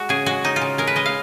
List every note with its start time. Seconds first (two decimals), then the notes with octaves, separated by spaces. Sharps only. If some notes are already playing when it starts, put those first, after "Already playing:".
Already playing: G#3 F#4
0.09 C#3 G#4
0.26 G#3 F#4
0.44 C#3 D#4
0.56 F4
0.62 C#3
0.78 G#3 A#4
0.87 B4
0.96 G#3 D#5
1.06 F5